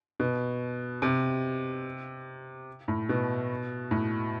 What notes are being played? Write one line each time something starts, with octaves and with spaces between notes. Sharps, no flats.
B2
C3
A2
B2
A2